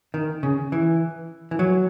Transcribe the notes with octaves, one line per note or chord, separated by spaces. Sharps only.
D#3
C#3
E3
E3
F#3